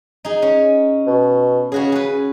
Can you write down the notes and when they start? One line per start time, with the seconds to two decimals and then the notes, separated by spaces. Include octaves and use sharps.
0.25 D#4 G#4
0.42 C#4
1.07 B2
1.72 C#3 C#4 F#4 G#4
1.92 G#4 B4